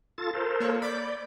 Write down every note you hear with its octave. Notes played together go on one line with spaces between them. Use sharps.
F4 A4 A6
A4 A#4 C5
A#3 C#5
D5 B5 D6 G6